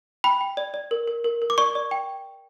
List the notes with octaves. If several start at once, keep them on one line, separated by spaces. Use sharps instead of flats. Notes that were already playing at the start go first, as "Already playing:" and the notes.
G5 B5
G5
D5
D5
A#4
A#4
A#4
A#4
D6
D5 C#6
D5
G5